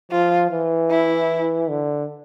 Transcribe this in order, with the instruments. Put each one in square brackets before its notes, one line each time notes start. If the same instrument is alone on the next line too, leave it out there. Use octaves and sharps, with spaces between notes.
[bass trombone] F3 [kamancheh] F4
[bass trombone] E3
[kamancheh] E4
[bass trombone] D3